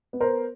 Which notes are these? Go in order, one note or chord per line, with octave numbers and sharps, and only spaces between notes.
B3
A#4 C5